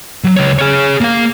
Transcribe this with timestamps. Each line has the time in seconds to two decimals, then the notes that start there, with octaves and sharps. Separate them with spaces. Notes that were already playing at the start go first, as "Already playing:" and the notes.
0.24 F#3
0.36 C#2 C#5
0.59 G#4 C#5
1.01 A#3 F5